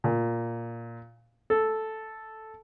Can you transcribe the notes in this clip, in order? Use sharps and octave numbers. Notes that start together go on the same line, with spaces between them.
A#2
A4